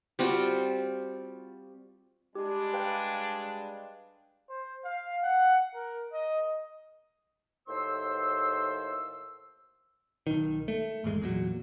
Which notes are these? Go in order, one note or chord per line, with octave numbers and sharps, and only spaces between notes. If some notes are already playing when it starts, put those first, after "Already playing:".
G3 C4 F4 F#4
G3 G#3 D4 G4
B4 F5 G5
C5
F5
F#5
A#4
D#5
D#2 A2 C5 C6 E6
B1 D#3
A3
G#1 E2 G#2 G#3
E2 A#2 F#3